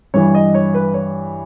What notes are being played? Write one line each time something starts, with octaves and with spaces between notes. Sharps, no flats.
G2 E3 C#5
D#5
C#5
B4
C#5